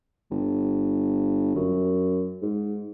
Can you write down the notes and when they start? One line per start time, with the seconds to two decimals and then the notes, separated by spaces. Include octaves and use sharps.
0.31 G1
1.55 F#2
2.42 G#2